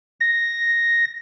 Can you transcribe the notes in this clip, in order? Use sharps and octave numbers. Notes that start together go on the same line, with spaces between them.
A#6